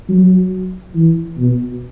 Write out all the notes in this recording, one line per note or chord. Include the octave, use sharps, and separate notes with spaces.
F#3
E3
B2